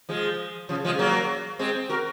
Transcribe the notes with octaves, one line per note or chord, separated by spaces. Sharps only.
F3 G#3
C#3 F3
F3 G#3
F#3 A#3
G#3 C4
F#4 A#4